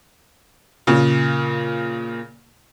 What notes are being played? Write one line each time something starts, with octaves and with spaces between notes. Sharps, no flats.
A#2 C#3